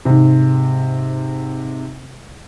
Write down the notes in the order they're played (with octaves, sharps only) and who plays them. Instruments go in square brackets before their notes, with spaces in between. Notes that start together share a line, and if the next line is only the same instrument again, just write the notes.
[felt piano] G#2 C3